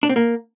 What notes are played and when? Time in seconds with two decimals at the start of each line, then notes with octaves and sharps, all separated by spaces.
0.03 D4
0.09 C4
0.16 A#3